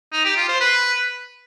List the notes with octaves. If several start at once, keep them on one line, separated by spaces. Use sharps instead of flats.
D#4
G4
F4
C5
B4